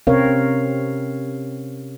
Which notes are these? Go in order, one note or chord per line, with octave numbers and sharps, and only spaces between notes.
C3 C4 C#4 A#4 C#5 F5